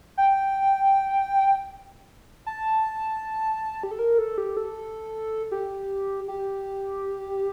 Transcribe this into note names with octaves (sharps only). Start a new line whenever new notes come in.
G5
A5
G4
A4
A#4
A4
G4
A4
G4
G4